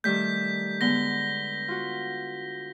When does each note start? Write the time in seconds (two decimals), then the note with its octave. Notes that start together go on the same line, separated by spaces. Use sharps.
0.04 D#3 G3 A3 G6 B6
0.81 D3 G#3 B3 A#6 G7
1.68 F4 F#4